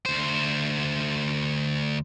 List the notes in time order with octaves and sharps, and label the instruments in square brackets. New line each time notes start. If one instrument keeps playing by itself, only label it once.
[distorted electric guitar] D2 C5